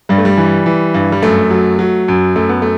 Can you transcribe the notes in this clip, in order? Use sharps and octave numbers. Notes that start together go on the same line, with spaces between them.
G2 G3
A3
G3
E3
E3
G2
G3
F#2 A3
F#3
F#3
F#2
F#2 A3
B3
A3